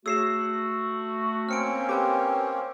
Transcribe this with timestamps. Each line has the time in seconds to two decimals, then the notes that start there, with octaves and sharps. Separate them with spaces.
0.06 A3 F#4 G#4 C#5 E6 C7 E7
1.49 A#3 C4 C#4 F6 C#7 D7
1.89 G4 B4 G5 D6